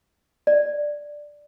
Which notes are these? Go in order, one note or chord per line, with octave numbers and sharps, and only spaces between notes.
D5